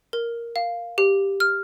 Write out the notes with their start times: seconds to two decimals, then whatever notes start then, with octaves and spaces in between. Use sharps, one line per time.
0.13 A#4
0.56 F5
0.98 G4
1.40 F6